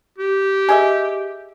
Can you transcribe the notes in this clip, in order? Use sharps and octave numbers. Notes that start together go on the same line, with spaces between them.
G4
G#4 D#5 E5